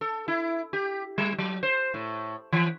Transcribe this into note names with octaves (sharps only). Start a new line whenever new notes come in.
A4
E4
G4
G3
F#3
C5
A2
E3